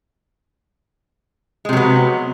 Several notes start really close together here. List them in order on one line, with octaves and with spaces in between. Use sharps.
G#3 C3 F#3 B3